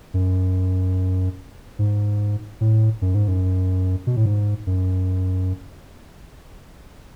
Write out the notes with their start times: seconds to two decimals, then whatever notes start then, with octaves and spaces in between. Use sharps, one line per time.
0.14 F#2
1.79 G#2
2.61 A2
3.02 F#2
3.15 G#2
3.28 F#2
4.07 B2
4.16 A2
4.26 G#2
4.67 F#2